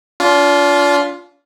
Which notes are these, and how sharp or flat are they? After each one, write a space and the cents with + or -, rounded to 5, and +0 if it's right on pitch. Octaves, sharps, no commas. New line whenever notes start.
D4 -40 F4 +5